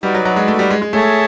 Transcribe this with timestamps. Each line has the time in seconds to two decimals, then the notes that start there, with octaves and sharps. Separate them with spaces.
0.03 G3 D#4 F#4 B4 D5
0.14 F#3
0.25 F#3
0.36 G#3
0.48 A3
0.59 G3
0.70 G#3
0.82 G#3
0.93 A3 G#4 C#5 E5 A5